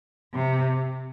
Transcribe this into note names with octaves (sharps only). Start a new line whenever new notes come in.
C3